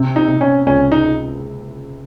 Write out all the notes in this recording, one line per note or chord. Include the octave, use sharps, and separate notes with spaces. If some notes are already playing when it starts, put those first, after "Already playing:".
Already playing: C3
D#4
C3
C#4
C#2 C#4
D#4